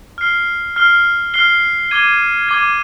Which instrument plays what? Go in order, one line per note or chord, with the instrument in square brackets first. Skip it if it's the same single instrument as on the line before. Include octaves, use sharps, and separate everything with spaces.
[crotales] F6 C7 G7
F6 C7 G7
F6 C7 G7
D6 G#6 D#7 G7
D6 G#6 D#7 G7